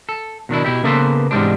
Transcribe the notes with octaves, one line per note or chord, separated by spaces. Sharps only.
A4
B2 D#3 D4 E4
B2 E4 G4
C#3 A#3 B3 A4 B4 C5
E2 G#2 C3 G3 G#3 D4